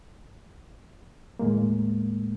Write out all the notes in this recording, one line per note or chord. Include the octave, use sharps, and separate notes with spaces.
D#2 A2 G#3 A#3